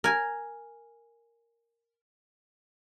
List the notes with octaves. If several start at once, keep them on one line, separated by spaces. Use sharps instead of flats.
A#4 G#5